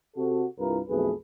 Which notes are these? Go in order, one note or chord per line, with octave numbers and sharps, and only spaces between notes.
C3 F#4 A4
C2 G2 E4 F4 A#4 B4
B1 F2 A3 G#4 B4